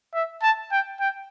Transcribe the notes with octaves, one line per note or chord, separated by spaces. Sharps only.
E5
A5
G5
G5